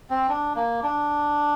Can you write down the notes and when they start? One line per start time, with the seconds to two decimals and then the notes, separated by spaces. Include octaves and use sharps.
0.10 C4
0.29 D4
0.56 A#3
0.83 D4